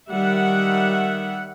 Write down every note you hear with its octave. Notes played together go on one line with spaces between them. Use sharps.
D#3 G3 E5 F#5